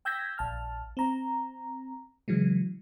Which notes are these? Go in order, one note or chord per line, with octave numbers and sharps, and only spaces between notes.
G5 E6 G6 G#6 A#6 B6
A#1 A5 F6
C4 A#5
C#3 E3 F#3 G#3